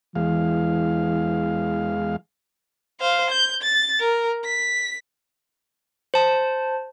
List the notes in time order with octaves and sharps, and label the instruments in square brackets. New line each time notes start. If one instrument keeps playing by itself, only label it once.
[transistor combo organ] E2 G#3 F5 [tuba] E3
[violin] C5 F5
G6
A6
A#4
B6
[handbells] C5 A5